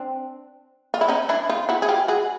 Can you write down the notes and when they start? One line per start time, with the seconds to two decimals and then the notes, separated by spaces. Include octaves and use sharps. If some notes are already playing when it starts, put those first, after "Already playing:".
Already playing: C4 D4
0.94 F4
1.01 E4
1.08 C#4 D#4
1.29 D4 E4
1.49 D#4 F4
1.69 E4 F#4
1.82 G#4
1.89 F4 G4
2.08 F#4 G#4